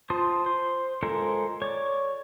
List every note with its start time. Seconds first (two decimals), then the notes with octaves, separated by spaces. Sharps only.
0.10 F4 C5 A5 D#6
0.46 C5
1.03 G#3 F4 A4 A#4 C5
1.62 C#5 D5